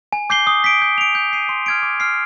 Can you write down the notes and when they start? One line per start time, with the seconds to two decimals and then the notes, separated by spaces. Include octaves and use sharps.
0.13 G#5
0.30 D6 G6 C7 G7
0.47 D#6
0.64 B6 D7
0.82 G6
0.98 D7 F7
1.15 G6
1.33 C7 D#7
1.49 C6
1.66 F6 G#6 D7
1.83 D6
2.00 F6 C7